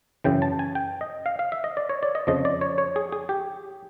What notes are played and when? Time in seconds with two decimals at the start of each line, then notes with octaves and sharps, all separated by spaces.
0.24 F#2 C#3 E3 G5
0.42 A5
0.59 G#5
0.75 G5
1.01 D#5
1.26 F5
1.39 F5
1.52 E5
1.64 D#5
1.77 D5
1.89 C#5
2.03 D5
2.15 D#5
2.27 F2 C#3 F3 D#5
2.45 D5
2.61 C#5
2.78 C#5
2.96 G#4
3.12 G#4
3.29 G4